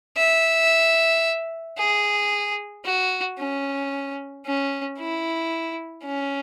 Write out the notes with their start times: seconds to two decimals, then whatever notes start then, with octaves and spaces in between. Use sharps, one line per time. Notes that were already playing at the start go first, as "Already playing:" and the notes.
0.17 E5
1.78 G#4
2.85 F#4
3.39 C#4
4.46 C#4
4.99 E4
6.05 C#4